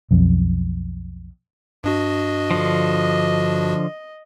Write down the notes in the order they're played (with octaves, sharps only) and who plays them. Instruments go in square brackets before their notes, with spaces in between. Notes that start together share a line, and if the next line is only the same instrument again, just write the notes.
[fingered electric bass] B1 F2
[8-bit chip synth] G2 D4 F#4 [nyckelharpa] D#5
[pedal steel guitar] D3 F3